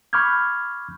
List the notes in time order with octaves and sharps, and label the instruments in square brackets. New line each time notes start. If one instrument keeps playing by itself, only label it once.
[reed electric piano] B5 C#6 D6 F6 G6 G#6